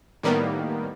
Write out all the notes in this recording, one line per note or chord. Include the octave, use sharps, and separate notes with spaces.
A2 D#3 G3 A#3 B3